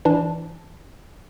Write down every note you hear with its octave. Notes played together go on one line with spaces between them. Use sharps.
E3 D4